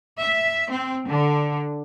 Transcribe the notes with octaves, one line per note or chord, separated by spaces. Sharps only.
E5
C4
D3